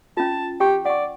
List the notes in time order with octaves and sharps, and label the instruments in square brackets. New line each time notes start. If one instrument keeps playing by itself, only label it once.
[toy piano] C#4 F4 [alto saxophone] A5
[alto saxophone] G4 [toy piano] G5 C#6
[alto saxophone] D5 [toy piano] F#5 C#6